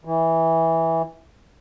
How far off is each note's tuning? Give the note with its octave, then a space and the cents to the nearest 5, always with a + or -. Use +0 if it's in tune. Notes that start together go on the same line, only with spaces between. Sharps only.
E3 -10